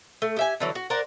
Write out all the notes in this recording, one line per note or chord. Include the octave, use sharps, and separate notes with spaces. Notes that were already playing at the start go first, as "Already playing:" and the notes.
A3
G4 E5 G#5
D3 E3 F#3
F#4
A#4 C5 D5 F#5